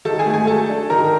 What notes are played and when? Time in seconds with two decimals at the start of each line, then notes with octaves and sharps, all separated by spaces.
0.05 D#3 A4 A5
0.19 G#4 G#5
0.26 A3
0.34 G#4 G#5
0.47 F#3 A4 A5
0.69 D4
0.90 D#3 A#4 A#5